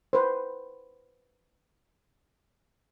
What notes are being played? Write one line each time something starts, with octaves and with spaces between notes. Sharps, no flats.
B4 C5